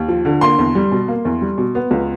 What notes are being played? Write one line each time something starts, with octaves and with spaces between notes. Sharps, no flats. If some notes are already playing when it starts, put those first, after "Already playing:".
Already playing: D#2
F3
D3
A#3 C6
E2
G3
B2
A#3
E2
G3
B2
B3
C#2